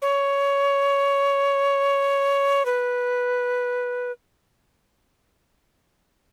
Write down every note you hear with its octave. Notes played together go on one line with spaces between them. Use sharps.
C#5
B4